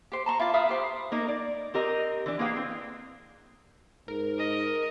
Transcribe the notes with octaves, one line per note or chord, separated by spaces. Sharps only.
G4 C5
A5 A#5 C6 C#6
E4 F4 D5 A5
B4 E5 F5 D#6
G4 C5
A#3 D#4 A#4
D5
C4 G4 A#4 D#5
E3 D4
A#3 E4 G#4 B4 F5 G5
C4
G#2 A#4
D#5